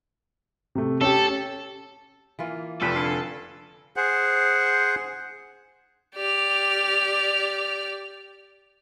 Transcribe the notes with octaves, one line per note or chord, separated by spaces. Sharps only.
C3 A3
C#4 G4 A4
E3 A#3 F4
F1 F3 F4 G4 A4 B4
D3 F5 G#5
G#4 C5 F#5
G4 D5 F6